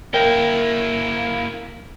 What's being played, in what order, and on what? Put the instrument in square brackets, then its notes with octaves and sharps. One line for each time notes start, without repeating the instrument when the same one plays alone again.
[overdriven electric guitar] A#3 E4 [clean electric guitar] A#4 G5